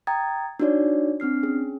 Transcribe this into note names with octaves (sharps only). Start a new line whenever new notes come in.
G5 A#5 D#6 G#6 A6
D4 D#4 F#4 C#5 D5
C4 D4 F6 C7
C#4 G#4